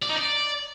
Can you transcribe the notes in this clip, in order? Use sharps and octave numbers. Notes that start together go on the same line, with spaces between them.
D5
D#4
D5